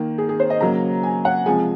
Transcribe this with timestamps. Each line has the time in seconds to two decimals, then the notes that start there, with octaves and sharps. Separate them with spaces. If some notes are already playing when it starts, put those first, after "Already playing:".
Already playing: D#3 A#3
0.18 G#4
0.29 G#4
0.40 C5
0.50 D#5
0.61 C#3 F#3 A#3 A#5
1.03 G#5
1.25 F#5
1.46 C3 F3 G#3 G#5